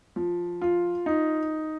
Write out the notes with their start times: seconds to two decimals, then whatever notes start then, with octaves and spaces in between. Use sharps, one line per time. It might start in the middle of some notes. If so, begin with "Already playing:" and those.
0.16 F3
0.61 F4
1.06 D#4